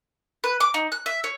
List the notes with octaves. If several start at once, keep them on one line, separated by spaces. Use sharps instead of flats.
B4
D6
D#4
F#6
E5
C#5